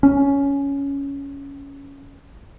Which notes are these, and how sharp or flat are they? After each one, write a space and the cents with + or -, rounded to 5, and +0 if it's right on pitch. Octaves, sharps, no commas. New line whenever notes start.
C#4 +10